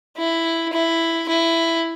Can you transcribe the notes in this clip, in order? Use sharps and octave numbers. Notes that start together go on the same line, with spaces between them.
E4
E4
E4